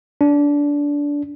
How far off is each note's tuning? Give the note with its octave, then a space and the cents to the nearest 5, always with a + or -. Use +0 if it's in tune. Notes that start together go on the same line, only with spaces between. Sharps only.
D4 -20